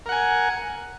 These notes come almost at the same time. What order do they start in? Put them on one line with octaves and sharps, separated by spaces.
A#4 F#5 G#5